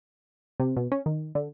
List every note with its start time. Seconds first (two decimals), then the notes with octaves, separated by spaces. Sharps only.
0.60 C3
0.77 B2
0.92 C#4
1.06 D#3
1.35 D3